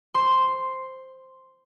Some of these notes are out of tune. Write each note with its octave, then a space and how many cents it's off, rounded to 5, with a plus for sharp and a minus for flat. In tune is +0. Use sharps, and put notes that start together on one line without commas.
C5 +0 C6 +0